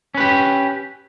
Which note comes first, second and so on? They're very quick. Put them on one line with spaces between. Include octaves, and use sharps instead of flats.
C#4 B4 G4